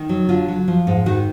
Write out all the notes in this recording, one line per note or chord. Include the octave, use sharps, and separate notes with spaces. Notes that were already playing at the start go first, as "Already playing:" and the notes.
Already playing: D#3
F#3
D3 F4
F#3
F3
G#2
D#3 F#4